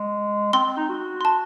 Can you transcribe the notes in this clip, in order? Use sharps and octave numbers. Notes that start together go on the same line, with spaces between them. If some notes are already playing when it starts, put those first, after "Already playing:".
Already playing: G#3
C4 C6
C4
D#4
F#4
C6
A5